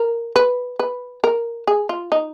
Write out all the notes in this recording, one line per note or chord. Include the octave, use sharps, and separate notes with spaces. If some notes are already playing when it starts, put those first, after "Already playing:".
Already playing: A#4
B4
B4
A#4
G#4
F4
D#4